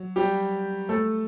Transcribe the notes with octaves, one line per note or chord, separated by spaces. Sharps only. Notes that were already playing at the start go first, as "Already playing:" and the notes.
Already playing: F#3
G3 G4
A3 A4